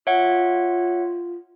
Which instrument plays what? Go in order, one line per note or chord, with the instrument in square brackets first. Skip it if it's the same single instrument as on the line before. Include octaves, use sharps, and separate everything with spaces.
[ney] F4 [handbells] C#5 E5 F#5